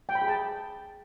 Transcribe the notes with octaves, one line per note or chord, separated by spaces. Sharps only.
G5
B5
G#4
A5